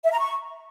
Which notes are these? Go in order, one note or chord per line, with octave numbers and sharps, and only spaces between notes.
E5
A#5
C#6